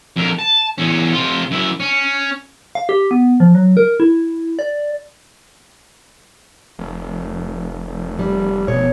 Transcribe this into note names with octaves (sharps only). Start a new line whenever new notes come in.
F2 A#4
A5
E2 C#4
C3 F4
F#2 E4
C#4
F5
G4
B3
F3
F#3
A#4
E4
D5
F1
G3
B2 C#5